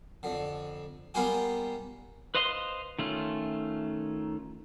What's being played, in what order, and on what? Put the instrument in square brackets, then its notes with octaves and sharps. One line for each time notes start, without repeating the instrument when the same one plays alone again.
[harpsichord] F2 D3
G3 A#3 B3 F4 G4 G#4
[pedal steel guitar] B4 C5 D#5 F5 C6
D#3 A3 C#4 F4